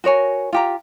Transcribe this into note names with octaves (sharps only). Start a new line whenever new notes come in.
F#4 A#4 C#5 G#5
F4 G4 A#5